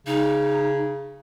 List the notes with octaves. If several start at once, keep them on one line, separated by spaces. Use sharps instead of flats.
C#3 D#4